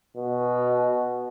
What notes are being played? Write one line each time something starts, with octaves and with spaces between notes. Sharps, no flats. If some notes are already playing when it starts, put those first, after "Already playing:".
B2